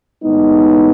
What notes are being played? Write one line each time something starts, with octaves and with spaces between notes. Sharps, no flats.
A2 E3 G#3 B3 D#4